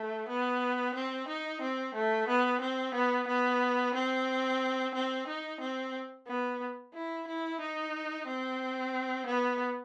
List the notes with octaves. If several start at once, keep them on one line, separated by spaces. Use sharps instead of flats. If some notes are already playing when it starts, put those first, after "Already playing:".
Already playing: A3
B3
C4
D#4
C4
A3
B3
C4
B3
B3
C4
C4
D#4
C4
B3
E4
E4
D#4
C4
B3